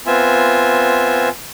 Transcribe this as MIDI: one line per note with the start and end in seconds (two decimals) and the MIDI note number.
0.06 1.29 59
0.06 1.29 60
0.06 1.29 65
0.06 1.29 76
0.06 1.29 80